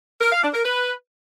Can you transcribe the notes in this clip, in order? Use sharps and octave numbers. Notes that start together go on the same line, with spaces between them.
A#4
F5
D4
A#4
B4